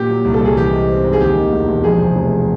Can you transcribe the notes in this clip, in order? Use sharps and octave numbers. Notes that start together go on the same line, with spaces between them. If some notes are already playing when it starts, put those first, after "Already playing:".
Already playing: A#2 G4
F#3
C2
A4
C2 G#4
E3 G4
G#3
C4
G#2
G#4
D#2 G4
D#3
E1
E1
F2 G#4
C3
F1